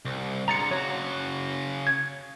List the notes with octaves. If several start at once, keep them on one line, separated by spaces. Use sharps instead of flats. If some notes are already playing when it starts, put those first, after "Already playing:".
C2
D3 G#3 A#5 A6 C#7
C#3 F#4 C#5
G#6